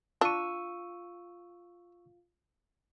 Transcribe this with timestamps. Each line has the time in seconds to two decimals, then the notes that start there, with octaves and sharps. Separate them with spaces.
0.21 D4 F4 F5 C#6 E6 D#7